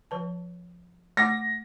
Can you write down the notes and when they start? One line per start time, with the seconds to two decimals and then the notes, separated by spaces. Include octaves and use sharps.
0.11 F3 B4 A5
1.17 A3 F#5 D6 A#6